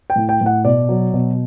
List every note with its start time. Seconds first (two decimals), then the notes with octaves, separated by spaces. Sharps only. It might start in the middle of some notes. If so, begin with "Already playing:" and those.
0.10 G5
0.16 A2
0.29 G5
0.41 A2
0.46 F#5
0.65 B2 D5
0.89 F#3
1.14 B2